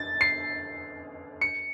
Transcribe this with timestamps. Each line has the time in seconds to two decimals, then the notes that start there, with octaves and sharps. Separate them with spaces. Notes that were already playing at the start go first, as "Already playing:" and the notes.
Already playing: A6
0.21 C7
1.41 C#7